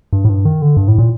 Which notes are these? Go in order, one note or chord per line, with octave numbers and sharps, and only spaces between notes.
G2
A2
G2
D#3
D3
G2
A2
A#2